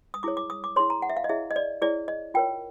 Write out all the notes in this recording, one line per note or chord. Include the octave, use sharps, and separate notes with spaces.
D#6
E4 G#4 C#5 D6
D6
D#6
D6
E4 G#4 C#5 C6
A#5
F#5
E5
F5
D#5
E4 G#4 C#5 E5
D#5
D5
E4 G#4 C#5 D5
D#5
F4 A#4 C#5 G5